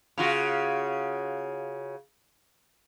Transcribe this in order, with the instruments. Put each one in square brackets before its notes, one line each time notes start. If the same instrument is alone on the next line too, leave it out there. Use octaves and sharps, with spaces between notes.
[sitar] C#3 F4 F#4